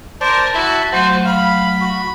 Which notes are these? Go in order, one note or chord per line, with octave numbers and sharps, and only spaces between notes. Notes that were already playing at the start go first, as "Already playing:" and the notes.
A#4 C5 D5 A5
E4 F#4 A5 B5
F#3 A3 F4 F#4 C5
F5 B5
F#4